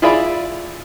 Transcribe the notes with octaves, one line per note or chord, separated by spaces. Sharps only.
E4 F4 G#4 D5 B5